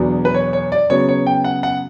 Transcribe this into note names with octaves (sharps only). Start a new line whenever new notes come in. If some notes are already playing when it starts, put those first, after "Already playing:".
Already playing: E2 B2 F#3 B3 D4
B4
C#5
C#5
D5
C#3 F#3 B3 C#5
C#5
G5
F#5
F#5